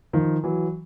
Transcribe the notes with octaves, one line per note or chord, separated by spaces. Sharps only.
D#3 F3
E3 F#3